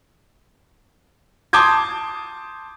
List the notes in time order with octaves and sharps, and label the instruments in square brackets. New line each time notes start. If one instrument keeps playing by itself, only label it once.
[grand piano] A5 C6 D6 D#6 G6 G#6